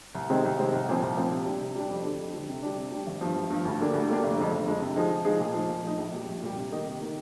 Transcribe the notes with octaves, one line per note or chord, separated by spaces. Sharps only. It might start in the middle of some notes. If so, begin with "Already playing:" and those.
C2
C3 D#3 G#3 C4
C2
C3 D#3 G#3 C4
C2
A#2 F3 C4
C2
A#2 F3 C4
C3
G3 D4
C3
G3 D4
F2
D3 G3
F2
D3 G3
C3
G3 D4
C3
G3 D4
G#1
G2 F3
G#1
G2 F3
D2
D3 G3 A#3 D4
D2
D3 G3 A#3 D4
F1
F2 D3 G#3
F1
F2 D3 G#3
C3
F3 G#3 D#4 G#4
C3
F3 G#3 D#4 G#4
A#2
F3 G#3 D#4
A#2
F3 G#3 D#4
A#1
A#2 G3
A#1
A#2 G3
C3
D#3 A#3 D#4
C3
D#3 A#3 D#4